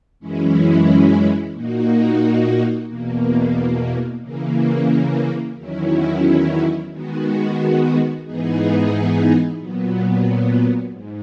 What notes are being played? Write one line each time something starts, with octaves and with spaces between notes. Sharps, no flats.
F#2 E3 G#3 C#4 E4
A#2 A#3 D#4 F#4
E2 B2 A#3
C#3 E3 A#3
E2 D#3 F#3 C#4 E4
D#3 G#3 B3 F#4
G#2 E3 B3 D#4 G#4
A#2 F#3 B3
G#2